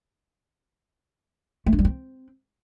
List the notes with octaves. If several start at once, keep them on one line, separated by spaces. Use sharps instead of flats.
A3
D4
G3
C4